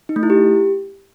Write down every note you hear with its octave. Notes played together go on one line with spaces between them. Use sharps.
D#4
A3
E4
G4